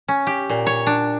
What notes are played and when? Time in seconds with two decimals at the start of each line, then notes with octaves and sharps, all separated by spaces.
0.08 C#4
0.27 G4
0.50 A#2
0.66 C#5
0.87 D4